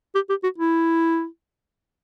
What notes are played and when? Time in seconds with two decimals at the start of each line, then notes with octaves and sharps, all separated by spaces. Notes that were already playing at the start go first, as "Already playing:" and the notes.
0.15 G4
0.29 G4
0.43 F#4
0.58 E4